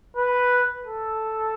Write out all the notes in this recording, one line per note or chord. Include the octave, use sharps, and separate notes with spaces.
B4
A4